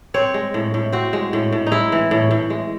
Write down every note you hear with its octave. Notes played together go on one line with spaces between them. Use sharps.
C4 C#5
G#3
A2
A2
C4 F#4
G#3
A2
A2
D#4
G#3 E4
E3
A2
A2
G#3